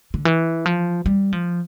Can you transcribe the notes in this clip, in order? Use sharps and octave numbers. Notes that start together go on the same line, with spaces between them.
D3
E3
F3
G3
F3